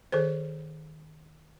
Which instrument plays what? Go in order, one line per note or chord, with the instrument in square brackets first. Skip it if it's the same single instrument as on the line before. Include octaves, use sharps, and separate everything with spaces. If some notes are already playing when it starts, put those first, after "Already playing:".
[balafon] D#3 G#4 A4 C5